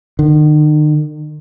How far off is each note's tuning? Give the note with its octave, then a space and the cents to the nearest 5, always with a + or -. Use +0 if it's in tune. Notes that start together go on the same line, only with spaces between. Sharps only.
D#3 -45